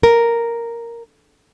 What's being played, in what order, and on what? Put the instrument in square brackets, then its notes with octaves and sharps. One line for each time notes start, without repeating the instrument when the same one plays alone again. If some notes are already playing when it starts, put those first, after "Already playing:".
[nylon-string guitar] A#4